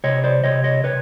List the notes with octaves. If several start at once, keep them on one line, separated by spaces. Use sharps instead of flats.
C3 C#5 D#5
C5 D5
C3 C#5 D#5
C#5 D#5
C3 B4 C#5